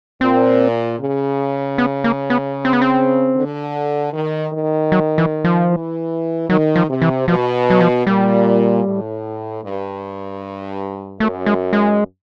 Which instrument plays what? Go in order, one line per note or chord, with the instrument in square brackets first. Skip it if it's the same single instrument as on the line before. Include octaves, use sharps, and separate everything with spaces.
[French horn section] A#2 [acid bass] C4
[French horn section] C#3
[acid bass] B3
A#3
B3
C4
B3
C4
[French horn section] D3
D#3
D#3
[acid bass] F#3
E3
F3
[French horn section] E3
[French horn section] D#3 [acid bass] F#3
[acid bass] F3
[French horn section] C3
[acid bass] E3
[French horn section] B2 [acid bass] F3
[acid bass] F#3
F3
[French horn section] A#2 [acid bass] G3
[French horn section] A2
G2
[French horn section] F#2 [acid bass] A3
[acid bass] G#3
G#3